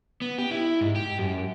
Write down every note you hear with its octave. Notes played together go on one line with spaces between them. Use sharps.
B3
G4
E4
G#2
G4
F#2